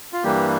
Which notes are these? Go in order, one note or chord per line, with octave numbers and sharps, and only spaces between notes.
F4
G2 E3 G3 A#3 G4